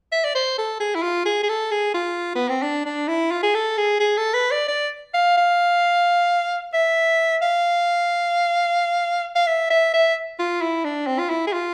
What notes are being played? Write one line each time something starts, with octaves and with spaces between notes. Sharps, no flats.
E5
D5
C5
A4
G#4
E4
F4
G#4
G#4
A4
G#4
F4
B3
C4
D4
D4
E4
F4
G#4
A4
G#4
G#4
A4
B4
D5
D5
F5
F5
E5
F5
F5
E5
E5
E5
F4
E4
D4
C4
F4
E4
G#4
F4